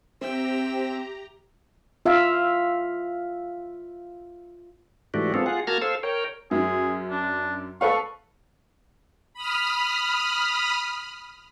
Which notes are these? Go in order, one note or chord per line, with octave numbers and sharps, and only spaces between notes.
C4 G4 E5 G5 A#5
F4 E5 F5
G#2 E3 A3 D4 F#4 G4
G#3 B3 C4 F4 A4
F4 G#4 F#5
A#3 F#4 A5 A#5 F6 G#6
A4 C5 F5 E6
A#4 C#5 G5
F#2 G#4
D4
A4 B4 F5 C#6
B5 D#6 F6